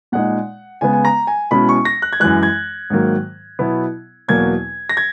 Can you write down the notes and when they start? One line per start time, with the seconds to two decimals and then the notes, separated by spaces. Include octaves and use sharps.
0.12 A#2 G#3 D#4 F#5
0.81 C#3 G#3 B3 G#5
0.93 G#5
1.05 A#5
1.27 G#5
1.51 B2 G#3 C#4 E4 B5
1.69 C#6
1.85 A#6
2.02 F#6
2.13 G#6
2.20 F#2 E3 G#3 F#6
2.43 G#6
2.90 G#2 D#3 F#3 A#3
3.59 B2 F#3 B3 E4
4.28 E2 B2 F#3 A#3 G#6
4.89 A#6
4.97 G#6